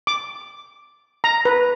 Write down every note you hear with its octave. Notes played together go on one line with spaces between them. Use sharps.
D6
A#5
B4